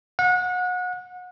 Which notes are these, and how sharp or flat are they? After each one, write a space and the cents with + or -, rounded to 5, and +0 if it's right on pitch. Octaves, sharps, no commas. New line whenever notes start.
F#5 -30